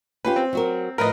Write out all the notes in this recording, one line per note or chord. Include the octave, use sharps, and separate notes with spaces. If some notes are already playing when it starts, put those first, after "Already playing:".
C#4 F4 G4 B4
C4
F#3 F#4 A#4
A2 F3 A#4 B4 D#5